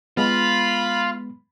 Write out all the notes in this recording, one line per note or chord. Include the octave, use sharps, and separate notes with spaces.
G#3 B3 F4 B5